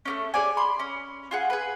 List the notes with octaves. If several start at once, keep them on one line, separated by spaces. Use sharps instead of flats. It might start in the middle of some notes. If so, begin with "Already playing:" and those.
A3 A#3 C#4
G#4 C#5 D5 G#5
B5 C6
C#4
F4 G#4 F#5
G#4 B4